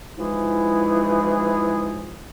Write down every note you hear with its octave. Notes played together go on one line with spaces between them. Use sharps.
E3 F3 G#3 D#4 E4 G#4